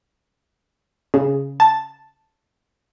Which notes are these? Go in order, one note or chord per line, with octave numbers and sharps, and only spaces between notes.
C#3
A5